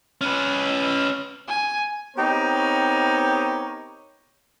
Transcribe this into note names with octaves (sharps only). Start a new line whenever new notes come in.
C#4 B4
G#5
B3 C4 D#4 G4 A#4 C#5